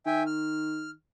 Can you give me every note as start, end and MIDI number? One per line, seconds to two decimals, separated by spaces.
0.06 0.92 51
0.06 0.23 76
0.06 0.23 79
0.06 0.23 80
0.26 0.90 89